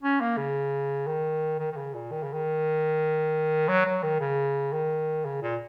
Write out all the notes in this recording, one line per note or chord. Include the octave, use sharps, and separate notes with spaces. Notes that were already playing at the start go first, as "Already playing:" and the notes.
C#4
A#3
C#3
D#3
D#3
D#3
C#3
A#2
D#3
C#3
D#3
F#3
F#3
D#3
C#3
D#3
C#3
A#2